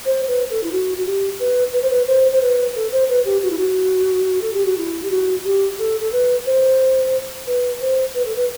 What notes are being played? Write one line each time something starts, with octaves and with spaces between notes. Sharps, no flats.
C5
B4
A4
E4
F#4
F#4
G4
B4
B4
C5
B4
C5
C5
B4
A4
C5
B4
G4
F#4
E4
F#4
A4
G4
F#4
E4
G4
F#4
G4
A4
A4
B4
C5
B4
C5
B4
A4
B4